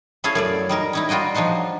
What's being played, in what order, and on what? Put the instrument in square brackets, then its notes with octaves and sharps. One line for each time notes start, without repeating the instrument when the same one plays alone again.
[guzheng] C#4 E4 G#4 A4 C#5 F5
F#2 A3 D5
G3 D#4 A#4
C#4 D#4 E4
G3 F4 F#4 D#5 G5
F3 D4 D#4 F#4 C5